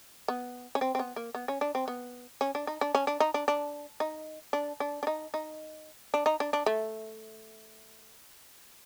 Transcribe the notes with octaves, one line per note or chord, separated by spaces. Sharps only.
B3
C#4
C4
C4
B3
A#3
B3
C#4
D4
C4
B3
C#4
D4
D#4
D4
C#4
D4
D#4
D4
D4
D#4
D4
D4
D4
D#4
D#4
D4
D#4
D4
D4
A3